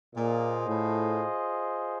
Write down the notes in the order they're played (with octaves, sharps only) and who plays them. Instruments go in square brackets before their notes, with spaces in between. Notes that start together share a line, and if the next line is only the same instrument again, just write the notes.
[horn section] A#2 [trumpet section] F4 G#4 C5 D#5
[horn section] A2